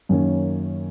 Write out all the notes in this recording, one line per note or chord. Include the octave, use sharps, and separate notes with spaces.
F#2 D#3 A#3 C#4